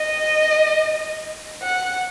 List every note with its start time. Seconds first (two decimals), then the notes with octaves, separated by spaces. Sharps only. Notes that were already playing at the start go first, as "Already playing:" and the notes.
Already playing: D#5
1.63 F#5